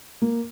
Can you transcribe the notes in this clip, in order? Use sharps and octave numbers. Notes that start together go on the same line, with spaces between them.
A#3